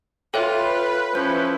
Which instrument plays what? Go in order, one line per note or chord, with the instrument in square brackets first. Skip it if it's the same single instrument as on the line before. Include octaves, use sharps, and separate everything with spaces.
[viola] F4 [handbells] A4 C#5 E5 [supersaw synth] B4 [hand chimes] G5
[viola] F3 C#4 [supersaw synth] E4 [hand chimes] C5 G6